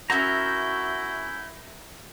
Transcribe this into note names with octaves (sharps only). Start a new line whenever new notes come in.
C#4 E4 F#4 A#4 E5 A#5 G6